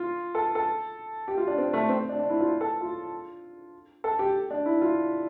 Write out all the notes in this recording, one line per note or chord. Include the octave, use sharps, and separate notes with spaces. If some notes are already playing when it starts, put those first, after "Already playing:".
Already playing: F4
A4
A4
G4
F4
D4
C4
A3
C4
D4
D4
E4
F4
A4
F4
A4
G4
D4
E4
F4